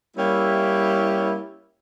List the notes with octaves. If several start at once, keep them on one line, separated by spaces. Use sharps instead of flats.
G3 A#3 C#4 E4 G4